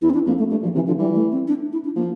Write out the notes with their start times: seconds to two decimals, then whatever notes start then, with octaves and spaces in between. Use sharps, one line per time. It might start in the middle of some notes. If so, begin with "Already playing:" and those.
0.02 E2 E4
0.10 C4
0.14 D4
0.26 F2 A#3
0.39 A3
0.51 G2 A3
0.63 A#2 F3
0.75 C3 E3
0.87 D3 F3
0.99 E3 G3
1.15 A3
1.32 C4
1.47 D4
1.72 E4
1.84 D4
1.96 F3 A#3